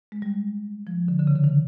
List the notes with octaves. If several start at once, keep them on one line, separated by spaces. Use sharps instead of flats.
G#3
G3
F3
D3
D3
C#3
D3
D#3